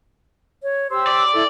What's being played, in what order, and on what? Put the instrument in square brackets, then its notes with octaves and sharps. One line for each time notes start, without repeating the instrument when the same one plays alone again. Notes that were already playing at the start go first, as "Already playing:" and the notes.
[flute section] C#5
G4 C5 E6
[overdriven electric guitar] D5
[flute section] E4 A4